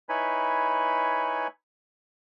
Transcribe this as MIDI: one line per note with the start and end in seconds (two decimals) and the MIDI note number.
0.09 1.47 63
0.09 1.47 64
0.09 1.47 71
0.09 1.47 73
0.09 1.47 80
0.09 1.47 83